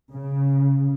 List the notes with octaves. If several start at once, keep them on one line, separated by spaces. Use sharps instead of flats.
C#3